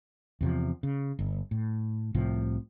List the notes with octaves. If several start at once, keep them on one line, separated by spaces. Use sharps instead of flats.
E2 C3 F3
C#3
G1
A2
C2 A2 C3 F3